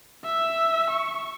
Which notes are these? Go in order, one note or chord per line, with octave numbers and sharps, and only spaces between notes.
E5
C#6